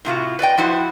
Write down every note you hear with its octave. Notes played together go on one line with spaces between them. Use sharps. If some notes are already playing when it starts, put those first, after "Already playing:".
A2 C3 F4 F#4
B4 D5 D#5 G5
F3 E4 F#4 C5